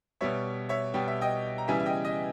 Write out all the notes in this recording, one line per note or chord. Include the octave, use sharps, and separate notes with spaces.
B2 G3 B3 C#5 E5
C#5 E5
B2 G3 B3 G5
E5
D#5 G5
A#5
C#3 E3 G3 B3 E5 G#5
E5
D#5 G5
D#5